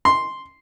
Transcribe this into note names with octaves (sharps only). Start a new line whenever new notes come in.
C6